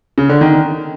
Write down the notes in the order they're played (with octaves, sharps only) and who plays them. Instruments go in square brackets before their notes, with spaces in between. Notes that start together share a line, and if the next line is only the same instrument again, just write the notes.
[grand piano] C#3
D3
D#3